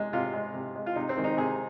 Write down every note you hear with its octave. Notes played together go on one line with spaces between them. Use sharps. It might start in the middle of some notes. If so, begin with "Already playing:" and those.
Already playing: C3 G#3
C3 F4
G#3
C3
G#3
F4
C3 D#4
C4
D#3 G#3
D#4
C3 G#4